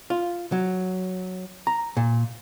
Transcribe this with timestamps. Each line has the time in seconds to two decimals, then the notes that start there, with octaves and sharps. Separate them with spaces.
0.10 F4
0.52 F#3
1.67 A#5
1.97 A#2